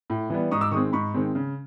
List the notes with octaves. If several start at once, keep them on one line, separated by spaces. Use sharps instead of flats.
A2
E3 G3 B3
G#2 C#6 D#6
D6 E6
D#3 G#3 C4 C#6 D#6
G#2 B5 C#6
D#3 G#3 C4
C#3